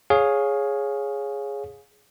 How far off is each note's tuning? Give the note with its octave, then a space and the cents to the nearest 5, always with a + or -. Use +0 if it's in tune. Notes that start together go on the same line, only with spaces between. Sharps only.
G#4 +0 C#5 +0 F5 +15